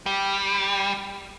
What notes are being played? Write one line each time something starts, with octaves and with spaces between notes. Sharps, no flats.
G3